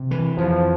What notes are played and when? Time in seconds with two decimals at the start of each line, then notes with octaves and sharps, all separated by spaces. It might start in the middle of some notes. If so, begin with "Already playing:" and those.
Already playing: C3
0.11 E3
0.38 F2 F3